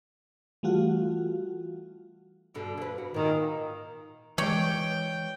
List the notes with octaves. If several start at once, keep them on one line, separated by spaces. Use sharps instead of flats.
E3 G3 A3 F4 F#4
G2 B2 D3
A#3 B4
F#4
A#2 D#3 A#3
E3 G#3 C#5 D5 G5